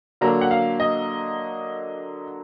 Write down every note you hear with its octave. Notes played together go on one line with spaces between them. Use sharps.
D3 F#3 A#3 D4 A#5
F#5
F5
D#5